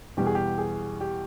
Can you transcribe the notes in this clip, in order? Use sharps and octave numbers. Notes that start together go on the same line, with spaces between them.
E2 B2 G3 G4
G#4
G4
G#4
G4